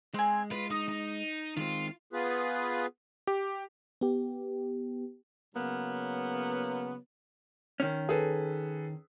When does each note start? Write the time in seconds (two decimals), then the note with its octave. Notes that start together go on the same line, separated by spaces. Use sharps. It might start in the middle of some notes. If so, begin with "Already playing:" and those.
0.14 G#3 C4 G#5
0.51 F4 B4
0.71 D#4 D#6
0.89 D#4
1.57 D#3 G#3 C4 F4
2.13 B3 F4 G#4 B4
3.27 G4
4.01 B3 G4
5.55 C#3 F#3 A#3 B3
7.80 D#3 C#4
8.09 G#4 A4 B4